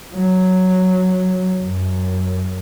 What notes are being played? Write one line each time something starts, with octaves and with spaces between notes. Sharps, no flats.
F#3
F#2